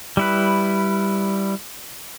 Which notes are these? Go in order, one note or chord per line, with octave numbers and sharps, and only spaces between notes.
G3 E4 B4